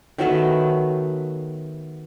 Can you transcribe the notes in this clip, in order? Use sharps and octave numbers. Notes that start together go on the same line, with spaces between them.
D#3 F#3 A3 B3